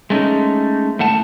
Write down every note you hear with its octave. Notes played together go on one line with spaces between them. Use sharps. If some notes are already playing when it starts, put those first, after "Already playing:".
G#3 A3 C#4 D#4
A2 A3 F#5 A5